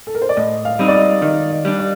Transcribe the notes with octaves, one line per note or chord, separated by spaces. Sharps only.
A4
A#4
C5
D5
A2 D#5
F5
G3 C4 D#4
D5
D#5
D#3 D#5
D#5
G3 D4
D5